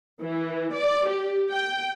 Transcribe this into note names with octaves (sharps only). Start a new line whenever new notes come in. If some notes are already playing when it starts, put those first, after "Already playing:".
E3
D5
G4
G5